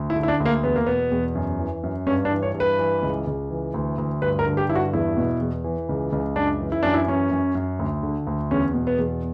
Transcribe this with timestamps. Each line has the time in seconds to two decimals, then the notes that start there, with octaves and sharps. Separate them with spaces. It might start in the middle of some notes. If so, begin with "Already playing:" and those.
Already playing: D2
0.10 E4
0.16 D3
0.23 E4
0.28 D4
0.40 D2
0.45 A#3
0.64 E2 B3
0.76 A#3
0.87 B2 B3
1.11 E2
1.35 F#2
1.59 E3
1.83 F#2
2.07 G2 C#4
2.25 D4
2.31 E3
2.43 C#5
2.54 G2
2.60 B4
2.79 E3
3.03 C#2
3.27 C#2
3.50 E3
3.74 D2
3.98 D2
4.22 G2 B4
4.39 A#4
4.46 D3
4.57 G4
4.69 G2 E4
4.75 F#4
4.93 E2 E4
5.17 B2
5.41 E2
5.64 E3
5.89 C#2
6.12 C#2
6.36 F#2 D4
6.60 E3
6.72 E4
6.83 F#2 D4
6.94 E4
7.08 E3 C#4
7.31 F#2
7.55 F#2
7.79 D2
8.03 D3
8.27 D2
8.51 E2 C#4
8.74 B2
8.87 B3
8.98 E2